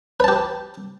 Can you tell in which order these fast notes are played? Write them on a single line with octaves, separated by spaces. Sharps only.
B4 A5 G4